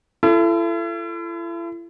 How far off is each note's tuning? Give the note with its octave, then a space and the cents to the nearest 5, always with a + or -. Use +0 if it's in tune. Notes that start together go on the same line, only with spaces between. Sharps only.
E4 +40 A4 +0